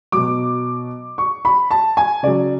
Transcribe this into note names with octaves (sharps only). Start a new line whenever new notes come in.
B2 F#3 D6
C#6
B5
A5
G#5
C#3 F#3 D5